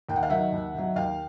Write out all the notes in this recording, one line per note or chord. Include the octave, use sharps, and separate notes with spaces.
D#2 G5
F#5
F5
D#3 F#3 E5 F#5
D#2
D#3 F#3
D#2 F5 G5